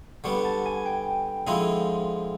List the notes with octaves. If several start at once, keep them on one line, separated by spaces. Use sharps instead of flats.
D3 G3 B3 C#6
A5
G#5
G5
D3 F3 G#3 C4 E4 D#5